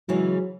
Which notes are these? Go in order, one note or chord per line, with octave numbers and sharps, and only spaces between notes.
C#3 E3 F#3 G#3 E4